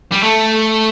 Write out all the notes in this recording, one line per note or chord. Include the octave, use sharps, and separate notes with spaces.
G3
A3